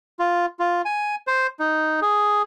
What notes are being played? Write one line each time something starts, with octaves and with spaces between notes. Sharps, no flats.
F4
F4
G#5
C5
D#4
G#4